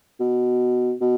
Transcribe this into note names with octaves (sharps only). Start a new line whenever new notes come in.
B2
B2